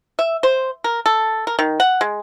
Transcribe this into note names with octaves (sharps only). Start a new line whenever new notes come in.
E5
C5
A#4
A4
A#4
D#3
F#5
G#3